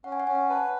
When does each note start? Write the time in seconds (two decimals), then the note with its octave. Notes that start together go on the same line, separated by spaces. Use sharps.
0.04 C#4 F#5
0.12 G#5
0.20 F#5
0.27 C#4 G#5
0.35 F#5
0.50 B4 A5